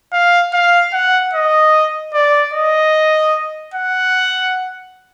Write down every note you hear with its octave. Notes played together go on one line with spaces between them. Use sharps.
F5
F5
F#5
D#5
D5
D#5
F#5